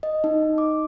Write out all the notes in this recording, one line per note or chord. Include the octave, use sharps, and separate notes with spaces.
D#5
D#4
D6